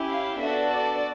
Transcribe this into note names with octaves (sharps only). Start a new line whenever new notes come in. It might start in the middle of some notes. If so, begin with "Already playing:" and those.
Already playing: C#4 E4 G4
F5
B3 D4 F#4 A4 E5
D5